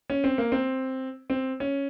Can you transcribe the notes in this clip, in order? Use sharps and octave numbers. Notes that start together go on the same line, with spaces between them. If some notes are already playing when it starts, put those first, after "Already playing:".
C#4
C4
A#3
C4
C4
C#4